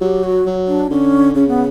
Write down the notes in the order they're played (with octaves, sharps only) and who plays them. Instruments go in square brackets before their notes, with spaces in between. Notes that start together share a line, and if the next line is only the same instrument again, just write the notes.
[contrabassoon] F#3 [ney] G4
[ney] F#4
[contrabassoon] F#3
[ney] D4
[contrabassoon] D3 [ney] C#4
[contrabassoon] C#3 [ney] C#4
[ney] B3